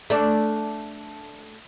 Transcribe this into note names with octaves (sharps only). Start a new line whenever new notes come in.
A3 D4